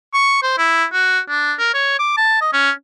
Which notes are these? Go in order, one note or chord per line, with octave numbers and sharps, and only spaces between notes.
C#6
C5
E4
F#4
D4
A#4
C#5
D6
A5
D#5
C#4